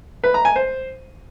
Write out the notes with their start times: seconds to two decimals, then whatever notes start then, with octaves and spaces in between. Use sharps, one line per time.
0.24 B4
0.34 A#5
0.45 G#5
0.56 C5